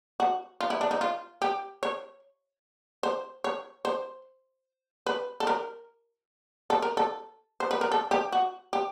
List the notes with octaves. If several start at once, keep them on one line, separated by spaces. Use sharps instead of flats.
F#4
F4
E4
D4
D#4
F4
G4
C#5
C5
C#5
C5
B4
A4
A#4
A4
A#4
A4
C5
B4
A#4
A4
G4
F#4
G4